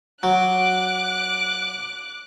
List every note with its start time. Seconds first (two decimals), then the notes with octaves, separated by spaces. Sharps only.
0.23 F#3 D6 F#6